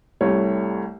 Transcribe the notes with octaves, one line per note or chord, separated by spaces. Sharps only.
C2 G3 A3 C#5